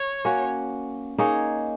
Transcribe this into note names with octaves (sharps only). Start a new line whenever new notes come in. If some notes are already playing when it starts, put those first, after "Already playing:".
Already playing: C#5
A#3 C#4 F#4
A#3 D#4 G#4 C#5